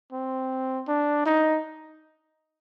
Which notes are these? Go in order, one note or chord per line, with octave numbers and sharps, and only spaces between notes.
C4
D4
D#4